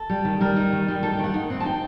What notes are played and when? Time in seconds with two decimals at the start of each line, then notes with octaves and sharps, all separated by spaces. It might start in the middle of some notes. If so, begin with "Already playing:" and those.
Already playing: A4
0.10 G3
0.25 D#3
0.41 G3 A#4
0.56 D#4
0.72 D#3
0.88 G3
1.03 D#4 A4
1.13 G4
1.19 D#3
1.24 F#5
1.34 D#4
1.50 C4 F#5
1.60 A5
1.65 D#4 G5